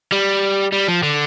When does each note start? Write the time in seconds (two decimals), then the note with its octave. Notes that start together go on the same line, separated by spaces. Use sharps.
0.12 G3
0.73 G3
0.88 F3
1.03 D3